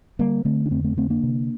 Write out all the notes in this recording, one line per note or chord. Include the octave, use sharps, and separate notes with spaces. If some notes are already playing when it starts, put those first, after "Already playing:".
D3 G3 A#3
D3 A3 C4
D4
F2 A3 C4
A3 C4
D3 A3 C4
A#3 D4
C3